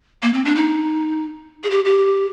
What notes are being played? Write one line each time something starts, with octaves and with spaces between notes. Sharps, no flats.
A#3
C4
D4
D#4
G#4
G4
G4